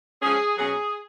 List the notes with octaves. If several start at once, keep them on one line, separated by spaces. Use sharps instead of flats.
F3 G#3 C#4 G#4
B2 F#3 C#4 G#4